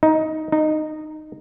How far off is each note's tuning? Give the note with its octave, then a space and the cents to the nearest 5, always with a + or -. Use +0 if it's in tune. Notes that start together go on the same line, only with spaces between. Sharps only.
D#4 +10
D#4 -15